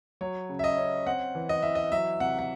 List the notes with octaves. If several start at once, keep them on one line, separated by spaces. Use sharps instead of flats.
F#3 C#5
C#3
E5
D#5
C#4
C4 F#5
E3
D#5
E3 E5
D#5
F#3 E5
C3 F#5
F#5